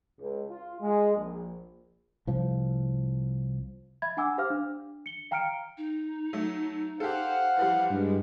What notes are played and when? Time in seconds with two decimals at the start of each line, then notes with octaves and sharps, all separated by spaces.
0.19 C#2
0.51 F4
0.80 G#3
1.15 A#1
2.27 C2 F3
4.02 E5 B5 G#6
4.17 D4 F#5 G#5 D6 E6
4.38 G4 C5 F5 D6 F6
4.50 D4
5.06 C#7 G7
5.31 F5 G5 A#5 F6 C#7 D7
5.77 D#4
6.33 F#3 A3
7.00 G4 A4 C5 F5 F#5
7.57 E3 F3 G3
7.90 G2 G#3